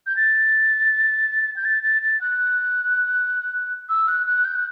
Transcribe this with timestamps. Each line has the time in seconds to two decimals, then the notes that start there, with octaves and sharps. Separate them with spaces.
0.07 G6
0.17 A6
1.57 G6
1.65 A6
1.83 A6
2.02 A6
2.21 F#6
3.89 E6
4.08 F#6
4.27 F#6
4.45 G6
4.55 F#6